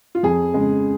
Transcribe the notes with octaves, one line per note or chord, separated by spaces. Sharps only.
F4
F2 G#4
C#3 G#3